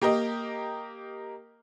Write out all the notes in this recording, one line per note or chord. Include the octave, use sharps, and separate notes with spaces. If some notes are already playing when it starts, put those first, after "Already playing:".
A#3 G4 A#4 D#5